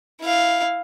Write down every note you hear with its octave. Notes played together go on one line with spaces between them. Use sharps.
E4 F5